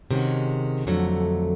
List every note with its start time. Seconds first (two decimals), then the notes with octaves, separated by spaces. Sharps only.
0.11 C3 D#3 G#3 C#4 F#4
0.87 F2 D3 F#3 A3